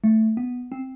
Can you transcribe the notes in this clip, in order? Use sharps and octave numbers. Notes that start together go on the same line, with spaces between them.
A3
B3
C4